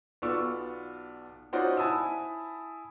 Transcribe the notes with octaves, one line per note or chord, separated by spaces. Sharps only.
B1 B3 F4 D5 C#6 E6
C#4 D#4 F4 F#4 C5 D5
E4 G#5 A5 B5 D#6 E6